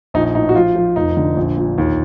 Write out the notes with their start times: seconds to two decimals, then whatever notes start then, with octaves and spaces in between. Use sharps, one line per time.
0.14 A#1 D#4
0.35 A2 D#4
0.49 F#4
0.55 F3 F4
0.76 F3
0.96 F1 D#4
1.17 D3
1.37 A#1
1.57 A#2
1.78 D#2